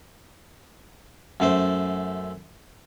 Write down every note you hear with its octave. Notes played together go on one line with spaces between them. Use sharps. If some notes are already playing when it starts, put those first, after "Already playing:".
F#2 A3 C5